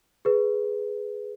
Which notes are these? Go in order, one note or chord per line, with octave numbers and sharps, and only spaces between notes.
G#4 B4